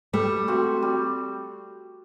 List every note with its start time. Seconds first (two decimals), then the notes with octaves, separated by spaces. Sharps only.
0.13 G3 A3
0.48 C4 F#4
0.82 G3